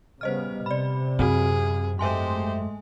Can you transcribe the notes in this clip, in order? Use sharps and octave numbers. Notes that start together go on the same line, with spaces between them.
C#3 G3 B3 C5 D#5 F6
C3 D5 B5
F#2 C4 F#4 G#4
G#2 G#3 A3 G4 C5 E5 G#5 C6